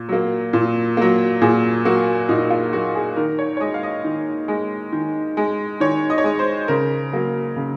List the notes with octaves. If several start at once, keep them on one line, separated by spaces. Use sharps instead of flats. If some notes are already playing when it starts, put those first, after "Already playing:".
Already playing: A#2
F#3 A#3
A#2
F#3 A#3
A#2 G#4
F#3 A#3 F#4
A#2 D#4
F4
F#3 A#3 F#4
G#4
D#3 A#4
C#5
C#5
G#3 D#5
F5
D#5
D#3
G#3
D#3
G#3
D#3 C#5
D#5
C#5
G#3 D#5
C5
C#3 A#4
F#3 A#3
C#3